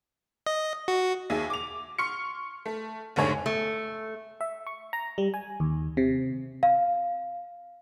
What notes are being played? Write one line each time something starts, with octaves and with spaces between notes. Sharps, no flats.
D#5
F#4
D#2 G#4 E5
D6 F7
C6 C#6 F6 C#7
A3
F1 G#2 D3 C#5 G#5
A3
E5
C#6
A#5
G3
G#5
D#2
C3
F5